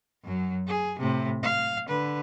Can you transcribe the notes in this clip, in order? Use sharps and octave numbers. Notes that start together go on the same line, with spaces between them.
F#2 F#3
G#4
A2 C3
F5
D3 B4